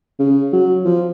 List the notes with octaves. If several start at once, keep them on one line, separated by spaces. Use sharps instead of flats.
C#3
F#3
F3